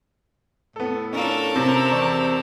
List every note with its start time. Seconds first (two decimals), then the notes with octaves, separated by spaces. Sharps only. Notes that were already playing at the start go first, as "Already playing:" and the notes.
0.76 A2 B3 A4
1.13 C#4 D4 F4 A4 A#4
1.56 C3 C4
1.91 E2 D5 C#6